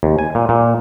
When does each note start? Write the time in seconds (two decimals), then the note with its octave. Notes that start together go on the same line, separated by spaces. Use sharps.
0.03 D#2
0.19 G#5
0.35 A#2
0.49 A#2